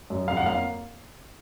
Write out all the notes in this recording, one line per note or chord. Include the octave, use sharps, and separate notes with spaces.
F#2
F2 F5
F#5
A#3 F5